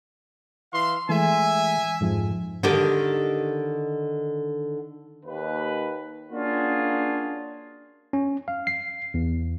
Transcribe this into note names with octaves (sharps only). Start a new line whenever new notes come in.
E3 F5 C6
E3 G#3 A3 E5 G#5
F2 G#2 F3
D3 D#3 G4
D#2 B4
A#3 C#4 D4 F4 F#4 G#4
C#4
F5
C7
E2